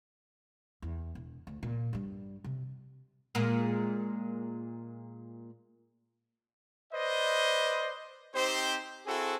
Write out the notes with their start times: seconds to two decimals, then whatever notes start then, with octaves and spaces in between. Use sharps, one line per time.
0.82 E2
1.15 E1
1.47 D2
1.63 A#2
1.93 G2 G3
2.44 C3
3.35 A#2 G#3 A#3
6.93 B4 C5 D5 D#5
8.35 C4 D#4 G4 C5
9.06 C4 E4 F#4 G#4 A4